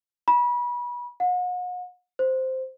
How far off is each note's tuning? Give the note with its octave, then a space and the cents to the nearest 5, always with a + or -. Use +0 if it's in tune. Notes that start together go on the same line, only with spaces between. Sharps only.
B5 -30
F#5 -40
C5 -5